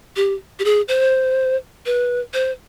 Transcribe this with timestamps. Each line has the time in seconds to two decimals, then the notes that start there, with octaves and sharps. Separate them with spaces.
0.16 G4
0.59 G4
0.65 G#4
0.88 C5
1.86 B4
2.34 C5